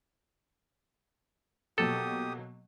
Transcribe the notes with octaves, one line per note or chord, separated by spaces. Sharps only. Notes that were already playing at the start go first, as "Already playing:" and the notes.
B2 F#3 A#3 G4 A4 D#6